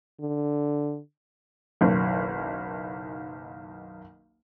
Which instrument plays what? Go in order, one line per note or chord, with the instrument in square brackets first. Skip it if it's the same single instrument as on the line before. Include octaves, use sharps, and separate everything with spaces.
[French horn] D3
[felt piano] F#1 B1 D#3